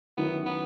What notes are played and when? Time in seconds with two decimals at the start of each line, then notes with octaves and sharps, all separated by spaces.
0.17 D#3 F#3 B3 C#4 E4
0.45 B3